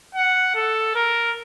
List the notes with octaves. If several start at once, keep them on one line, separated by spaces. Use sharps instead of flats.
F#5
A4
A#4